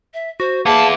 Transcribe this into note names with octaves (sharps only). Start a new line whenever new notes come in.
E5
F#4 C5
A#3 B3 E4 G#4 A5